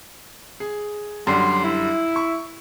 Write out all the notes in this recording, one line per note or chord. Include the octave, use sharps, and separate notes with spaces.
G#4
F#2 D3 F#3 G3 D5 C6
E4
C#6